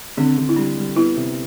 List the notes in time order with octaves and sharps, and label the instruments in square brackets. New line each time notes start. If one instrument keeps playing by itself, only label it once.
[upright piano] D3 [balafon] C4
[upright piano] D3
[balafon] E4
[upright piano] G3 [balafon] D4
[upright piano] G3
[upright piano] B3 [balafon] E4
[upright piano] C3